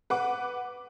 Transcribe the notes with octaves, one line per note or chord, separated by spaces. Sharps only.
B4 F#5 D6